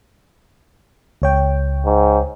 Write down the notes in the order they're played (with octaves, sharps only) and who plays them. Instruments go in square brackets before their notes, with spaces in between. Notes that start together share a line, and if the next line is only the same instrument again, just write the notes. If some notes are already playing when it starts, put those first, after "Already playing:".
[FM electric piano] C#2 C#5 G5
[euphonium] G#2